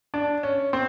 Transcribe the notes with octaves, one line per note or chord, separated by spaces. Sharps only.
D4
C#4
C4